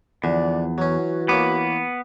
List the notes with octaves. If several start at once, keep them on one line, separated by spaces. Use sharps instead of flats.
E2 D3 F3 D5
E3 F#3 C#4 F#4
A#3 B3 C#4 D6